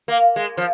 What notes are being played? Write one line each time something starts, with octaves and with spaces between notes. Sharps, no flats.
A#3
G#3
F3